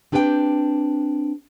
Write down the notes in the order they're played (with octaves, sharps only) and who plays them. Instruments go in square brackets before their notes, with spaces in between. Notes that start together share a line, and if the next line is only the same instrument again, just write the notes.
[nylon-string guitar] C4 D4 G4 B4 D#5 G5